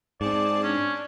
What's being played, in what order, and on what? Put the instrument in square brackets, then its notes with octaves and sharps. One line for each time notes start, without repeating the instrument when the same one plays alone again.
[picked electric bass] G#2 [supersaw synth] C4 G#4 A5 [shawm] D5
[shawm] C#4 [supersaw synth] D4